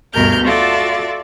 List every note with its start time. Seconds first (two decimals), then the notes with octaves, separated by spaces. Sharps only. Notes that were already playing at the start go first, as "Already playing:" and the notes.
0.13 D2 G2 B2 A#4 F6 G6
0.44 F4 F#4 A4 D5 E5